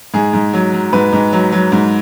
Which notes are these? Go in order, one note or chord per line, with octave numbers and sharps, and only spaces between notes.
G#2 G#4
G#2
F#3
F#3
G#2 B4
G#2
F#3
F#3
G#2